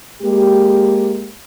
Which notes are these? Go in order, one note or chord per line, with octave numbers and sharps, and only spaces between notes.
G#3 A#3 G4